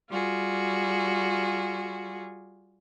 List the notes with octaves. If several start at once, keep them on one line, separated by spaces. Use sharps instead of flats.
G3 F4 F#4 G#4